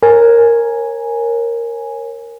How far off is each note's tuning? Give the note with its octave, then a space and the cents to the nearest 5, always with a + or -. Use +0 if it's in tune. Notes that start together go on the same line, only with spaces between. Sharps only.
A#4 +0 C#5 -35 G#5 +0